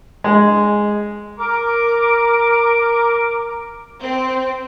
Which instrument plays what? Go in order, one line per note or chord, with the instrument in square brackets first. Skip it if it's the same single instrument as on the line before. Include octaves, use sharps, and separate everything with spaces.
[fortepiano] G#3
[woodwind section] A#4 D6
[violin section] C4